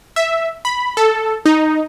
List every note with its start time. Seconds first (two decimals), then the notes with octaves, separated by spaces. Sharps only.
0.16 E5
0.65 B5
0.97 A4
1.45 D#4